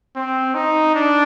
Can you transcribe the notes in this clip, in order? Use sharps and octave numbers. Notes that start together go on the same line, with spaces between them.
C4
D#4
D4